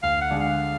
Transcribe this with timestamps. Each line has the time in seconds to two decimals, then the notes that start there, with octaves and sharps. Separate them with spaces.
0.03 D2 F5
0.21 F#5
0.31 D3 G#3 D4 G#4
0.40 F5